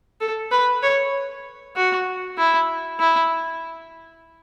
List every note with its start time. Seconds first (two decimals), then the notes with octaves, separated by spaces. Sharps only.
0.21 A4
0.51 B4
0.82 C#5
1.76 F#4
2.37 E4
2.99 E4